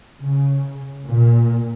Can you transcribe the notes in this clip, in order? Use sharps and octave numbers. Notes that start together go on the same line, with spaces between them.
C#3
A#2